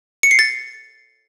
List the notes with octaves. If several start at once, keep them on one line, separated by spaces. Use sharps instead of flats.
C#7
C7
A6